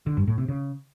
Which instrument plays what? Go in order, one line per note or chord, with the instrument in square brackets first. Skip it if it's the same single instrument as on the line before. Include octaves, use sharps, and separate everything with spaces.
[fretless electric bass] D3
G2
A2
C3
C#3